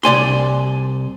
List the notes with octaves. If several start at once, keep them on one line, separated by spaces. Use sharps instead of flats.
C2 D5 G#5 C6